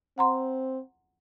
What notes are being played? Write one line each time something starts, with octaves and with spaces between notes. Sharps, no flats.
C4 F#5 A#5 C6